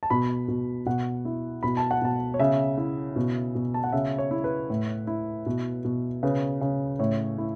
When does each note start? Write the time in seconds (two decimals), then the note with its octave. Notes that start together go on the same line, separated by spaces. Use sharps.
0.03 A5
0.10 B2 B5
0.48 B2
0.86 B2 F#5
1.25 E4
1.63 B2 B5
1.77 A5
1.91 F#5
2.02 B2 A5
2.34 C#5
2.40 C#3 E5
2.78 E4
3.16 B2
3.55 B2
3.74 A5
3.84 F#5
3.93 C#3 E5
4.18 C#5
4.31 E4
4.44 B4
4.70 A2
5.07 E4
5.46 B2
5.85 B2
6.23 C#3 B4
6.61 C#3
6.99 A2 C#5
7.38 E4